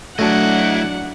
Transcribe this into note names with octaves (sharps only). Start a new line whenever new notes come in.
F#3 A3 D4 E4 F#4 D#5 F#5 A5